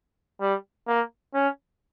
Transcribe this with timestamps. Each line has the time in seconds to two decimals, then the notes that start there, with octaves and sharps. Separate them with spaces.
0.40 G3
0.87 A#3
1.34 C#4